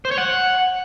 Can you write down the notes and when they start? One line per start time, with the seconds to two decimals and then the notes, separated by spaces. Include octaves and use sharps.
0.05 C5
0.11 C#5
0.18 F#5